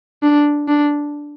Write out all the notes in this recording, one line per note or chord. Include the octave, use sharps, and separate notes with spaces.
D4
D4